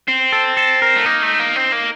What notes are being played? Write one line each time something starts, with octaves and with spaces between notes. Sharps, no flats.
C4
A4
A4
A#4
A3
A#3 D#4
A3
A#3
C4
A#3